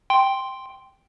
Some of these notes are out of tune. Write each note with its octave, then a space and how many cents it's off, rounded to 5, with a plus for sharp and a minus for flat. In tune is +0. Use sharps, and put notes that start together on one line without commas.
G5 +0 C6 +0